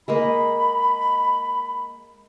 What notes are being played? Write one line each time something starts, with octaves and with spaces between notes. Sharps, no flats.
G#3 A#3 D#5 B5